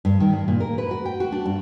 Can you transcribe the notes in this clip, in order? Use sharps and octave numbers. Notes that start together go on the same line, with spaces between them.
G2
D#3
G2
A#2
A#4
B4
F#4
G5
F#4
D4
G2